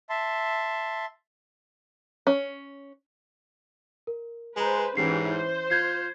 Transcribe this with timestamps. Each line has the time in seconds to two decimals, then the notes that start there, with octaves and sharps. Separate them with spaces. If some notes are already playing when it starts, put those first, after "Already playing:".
0.10 E5 A5 C6
2.27 C#4
4.07 A#4
4.56 G#3 B4 C5 G#5 A#5
4.97 G#2 E3 C#4 G4 C7
5.31 C5
5.70 F4 G6 G#6 C7